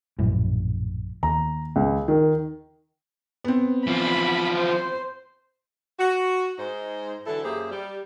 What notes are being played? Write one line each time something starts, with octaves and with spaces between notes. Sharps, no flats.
A#1 F#2 A2
D#2 A#5
C#2
D#3
B3 C4
E3 F3 B5
C5
F#4
G#2 G#3 D#4 C5
D3 E3 F#3 E4 A4
F#2 A#3 G4 G#4 C5 E5
G3